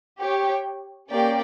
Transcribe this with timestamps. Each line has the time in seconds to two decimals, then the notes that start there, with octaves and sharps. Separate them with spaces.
0.19 G4 C#5 G5
1.10 A#3 C#4 G4 D5 G5